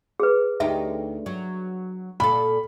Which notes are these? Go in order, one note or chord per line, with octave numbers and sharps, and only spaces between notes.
G#4 B4
D2 D#4 G4 E5
F#3
A#2 A4 B5